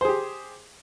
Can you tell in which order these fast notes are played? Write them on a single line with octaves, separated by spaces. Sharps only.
C5 G#4 G4